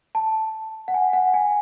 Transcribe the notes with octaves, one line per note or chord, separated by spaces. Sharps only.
A5
F#5
G#5
F#5
G#5